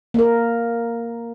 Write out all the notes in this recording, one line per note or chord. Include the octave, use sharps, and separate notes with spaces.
A#3 A#4